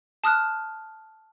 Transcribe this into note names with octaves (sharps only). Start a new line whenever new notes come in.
A5 D#6 F6 F#6